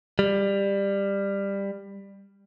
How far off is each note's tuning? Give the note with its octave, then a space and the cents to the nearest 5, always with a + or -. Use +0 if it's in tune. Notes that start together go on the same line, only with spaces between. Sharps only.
G3 +15